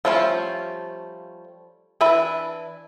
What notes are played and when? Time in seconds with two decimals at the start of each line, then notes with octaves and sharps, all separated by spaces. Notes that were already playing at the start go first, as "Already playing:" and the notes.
0.05 F3 G3 A3 C#4 F4
2.01 E3 D4 B4 E5